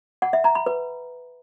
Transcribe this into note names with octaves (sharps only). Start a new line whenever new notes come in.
F#5
E5
A#5
B5
B4